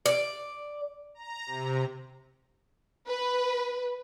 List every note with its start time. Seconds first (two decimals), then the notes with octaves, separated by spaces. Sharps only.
0.06 D5
1.15 A#5
1.46 C3
3.07 B4